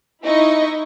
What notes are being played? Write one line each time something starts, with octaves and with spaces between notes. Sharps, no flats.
D#4 E4 D#5 C#6